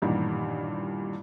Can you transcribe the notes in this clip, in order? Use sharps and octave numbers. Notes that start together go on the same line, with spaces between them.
A1 G2 A#2 D#3